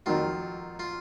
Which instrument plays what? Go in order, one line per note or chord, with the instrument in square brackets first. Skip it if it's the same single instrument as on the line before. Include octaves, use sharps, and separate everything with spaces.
[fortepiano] F2 D#3 F#3 [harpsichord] F4
[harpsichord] F4